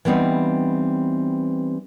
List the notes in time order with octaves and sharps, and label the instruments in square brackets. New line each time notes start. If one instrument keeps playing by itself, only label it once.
[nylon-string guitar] E3 G3 B3 C4 D#4